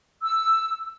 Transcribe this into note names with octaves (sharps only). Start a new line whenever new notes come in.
E6